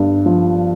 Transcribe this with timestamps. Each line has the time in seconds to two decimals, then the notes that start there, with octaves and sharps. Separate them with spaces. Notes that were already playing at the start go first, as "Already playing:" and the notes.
Already playing: G1 G2
0.26 F3